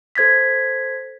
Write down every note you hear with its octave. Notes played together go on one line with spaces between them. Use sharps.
A4 C5 G#6 A6 B6